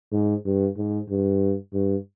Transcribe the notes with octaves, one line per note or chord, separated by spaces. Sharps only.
G#2
G2
G#2
G2
G2